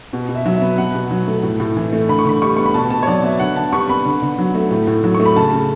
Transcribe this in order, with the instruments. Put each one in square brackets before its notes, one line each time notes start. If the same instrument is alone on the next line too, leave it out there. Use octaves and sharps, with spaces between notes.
[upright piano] B2
B2
E5
F#3
E5
B3
B2 F#5
B2
F#3
A3
A2
A2
E3
A3
D3 B5
C#6
D3 B5
G3 C#6
B3 C#6
B5
B2 A5
B2 A5
C#5
F#3 D5
B3 E5
D3 F#5
D3 A5
G3 C#6
B3 B5
D3
D3
F#3
A3
A2
A2
F#3
C#6
A3
B5
C#3 A5
C#3